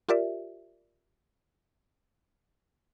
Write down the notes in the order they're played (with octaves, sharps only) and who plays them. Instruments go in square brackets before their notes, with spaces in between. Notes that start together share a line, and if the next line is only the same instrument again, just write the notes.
[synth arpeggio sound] F4 G4 A#4 D5 E5